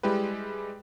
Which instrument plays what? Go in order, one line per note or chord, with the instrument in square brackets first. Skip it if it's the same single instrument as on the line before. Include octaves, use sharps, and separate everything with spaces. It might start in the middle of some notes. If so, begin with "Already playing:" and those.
[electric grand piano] G3 G#3 E4 G4 B4